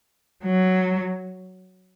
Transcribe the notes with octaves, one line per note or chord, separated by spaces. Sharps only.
F#3